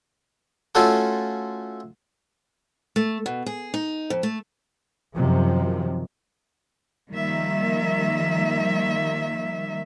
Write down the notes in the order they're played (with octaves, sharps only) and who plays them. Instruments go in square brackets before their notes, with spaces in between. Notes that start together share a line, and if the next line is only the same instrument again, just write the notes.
[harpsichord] A3 C#4 F4 F#4 A4
[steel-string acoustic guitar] A3
B2
G#4
D#4
F2
A3
[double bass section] F#2 C3 D#3 F3
[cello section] D#3 F3 G3 A#3 E5